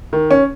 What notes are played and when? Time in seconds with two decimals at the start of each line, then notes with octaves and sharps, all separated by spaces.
0.13 D#3
0.31 C#4